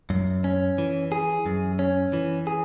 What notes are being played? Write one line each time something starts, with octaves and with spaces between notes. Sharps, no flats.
F#2
C#4
E3
G#4
F#2
C#4
E3
G#4